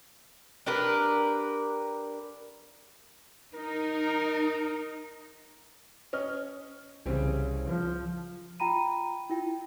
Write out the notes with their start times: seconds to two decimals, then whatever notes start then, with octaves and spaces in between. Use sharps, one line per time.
0.66 D4 G4 A#4 B4
3.55 D#4 A#4
6.13 C#4 D#5 F6
7.06 C2 C#3 E3 G3 C4
7.65 F3
8.60 F4 G5 A#5 B5 D#7
9.30 E4 F4 G5